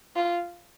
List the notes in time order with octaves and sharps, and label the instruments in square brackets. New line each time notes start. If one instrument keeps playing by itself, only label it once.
[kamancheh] F4